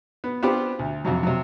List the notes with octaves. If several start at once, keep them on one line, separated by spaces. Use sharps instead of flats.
B3
B3 C4 D4 F4 G4 B5
D2
F2 C3 F#3
C3 F#3